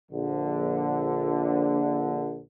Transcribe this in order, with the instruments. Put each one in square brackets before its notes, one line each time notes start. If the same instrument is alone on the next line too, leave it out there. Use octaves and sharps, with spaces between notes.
[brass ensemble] A#1 D3